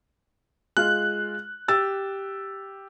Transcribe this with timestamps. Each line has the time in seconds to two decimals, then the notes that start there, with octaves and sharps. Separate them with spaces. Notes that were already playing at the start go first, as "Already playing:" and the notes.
0.77 G#3 F4 F6 F#6
1.68 G4 E6 A6